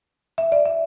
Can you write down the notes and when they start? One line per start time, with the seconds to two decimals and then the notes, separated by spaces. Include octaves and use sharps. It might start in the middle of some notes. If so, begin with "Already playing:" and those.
0.38 E5
0.52 D5
0.65 E5